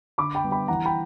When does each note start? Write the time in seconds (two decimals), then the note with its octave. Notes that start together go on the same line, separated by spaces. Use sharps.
0.18 D3 B5 D6
0.35 G5 B5
0.44 G3 B3
0.51 G5 B5
0.68 E3 F#5 A#5
0.86 G5 B5